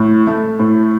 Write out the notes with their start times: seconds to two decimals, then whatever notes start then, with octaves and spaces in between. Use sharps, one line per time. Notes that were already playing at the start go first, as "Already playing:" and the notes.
Already playing: A2
0.27 A3
0.60 A2